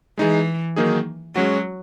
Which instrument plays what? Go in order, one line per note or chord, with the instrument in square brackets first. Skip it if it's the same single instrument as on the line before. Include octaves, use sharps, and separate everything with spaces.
[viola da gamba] E3 [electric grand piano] G#3 D#4 G#4
[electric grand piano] D#3 F#3 A#3 D#4 G#4
[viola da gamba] F#3 [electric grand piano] G#3 C#4 F#4